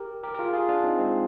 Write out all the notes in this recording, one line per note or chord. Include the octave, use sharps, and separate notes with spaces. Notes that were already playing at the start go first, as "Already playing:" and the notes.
Already playing: G4 A#4
G4 A#4
A#4
F4 G#4
F4 G#4
D4 F4
C4 D#4
G#3 C4